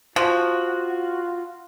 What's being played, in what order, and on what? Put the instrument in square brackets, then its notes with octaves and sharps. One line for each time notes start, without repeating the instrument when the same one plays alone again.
[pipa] F3 [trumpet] F4 [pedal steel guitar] F#4